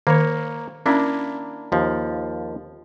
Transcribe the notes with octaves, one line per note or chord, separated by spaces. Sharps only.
D#3 A#3 C#5
A#3 C#4 D4 E4
D#2 F3